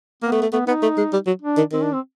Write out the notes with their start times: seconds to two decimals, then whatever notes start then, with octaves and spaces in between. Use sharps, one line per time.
0.23 A#3 B3
0.32 A3
0.42 A3
0.52 A3 B3
0.67 B3 D#4
0.82 A3
0.98 G#3
1.13 G3
1.27 F#3
1.42 D4
1.57 D#3
1.72 D#3 C4
1.82 D4
1.92 C4